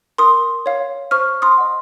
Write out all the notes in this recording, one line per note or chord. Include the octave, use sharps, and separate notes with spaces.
A#4 C6 D#6
C#5 F5
C5 C#6 F6
C6 D#6
D#5 F#5